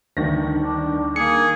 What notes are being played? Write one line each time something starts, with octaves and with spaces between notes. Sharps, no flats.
G1 D2 D#3 A#6
D4
A#3 G#4 C#7